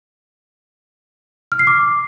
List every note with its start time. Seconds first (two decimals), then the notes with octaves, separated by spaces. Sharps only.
1.52 F6
1.59 C7
1.67 D6